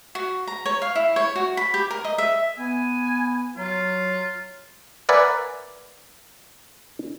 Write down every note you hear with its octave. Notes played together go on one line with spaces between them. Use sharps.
F#4
A#5
C#5
F5
E4
C#5
F#4
B5
G4
A#4
D#5
E5
B3 G#5
F#3 F4
A#4 B4 D5 E5 F#5 G#5